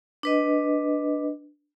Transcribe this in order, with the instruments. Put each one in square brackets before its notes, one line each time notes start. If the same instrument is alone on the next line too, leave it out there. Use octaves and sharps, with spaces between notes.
[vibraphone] D4 B4 D#5